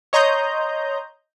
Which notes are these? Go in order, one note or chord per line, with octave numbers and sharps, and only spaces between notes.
C#5 D#5 A#5 C6 G6